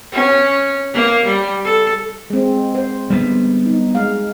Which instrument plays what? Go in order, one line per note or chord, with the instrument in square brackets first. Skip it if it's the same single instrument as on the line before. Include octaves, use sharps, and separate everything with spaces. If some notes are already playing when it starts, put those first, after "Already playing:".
[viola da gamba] C#4
A#3
G3
A4
[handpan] G#3 C4
C5
[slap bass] G3 A3 B3
[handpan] D#4
G#3 F5